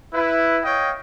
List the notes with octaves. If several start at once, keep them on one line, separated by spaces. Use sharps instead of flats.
E4 B4
C#5 D#5 F5 G5